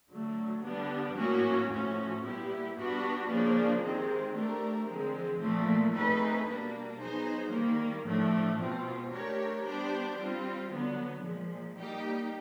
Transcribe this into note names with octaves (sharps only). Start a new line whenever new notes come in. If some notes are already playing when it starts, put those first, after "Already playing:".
D3 F#3 A3
D3 G3 B3 D4
A2 F#3 A#3 C#4 F#4
A2 F3 A3 C#4 F#4
A#2 G3 B3 E4 G4
G3 B3 D4 F#4 B4
C#3 F3 A#3 D4
C3 D#3 G#3 C4
A3 D4 G4 A#4
D3 F3 G#3 C4
A#2 F3 A3
A3 C4 D#4 G#4 B4
B2 G3 A#3 D4
F#3 B3 D#4 G#4 C5
D#3 G3 A#3
A2 F3 A3 D4
B2 G#3 C4 F4
A3 D4 G4 A#4 C#5
G3 B3 D4 G4 C5
G3 C4 F4
D3 F#3 B3
A#2 F3 G#3
G3 A#3 D#4 G4